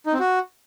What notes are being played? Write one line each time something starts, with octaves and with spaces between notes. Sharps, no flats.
D#4
C4
F#4